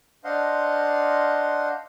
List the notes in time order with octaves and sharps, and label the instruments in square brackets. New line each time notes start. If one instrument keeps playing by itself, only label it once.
[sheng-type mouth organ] D4 C5 D#5 F5 F#5 C6